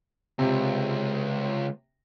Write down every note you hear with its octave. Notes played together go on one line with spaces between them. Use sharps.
C#2 C3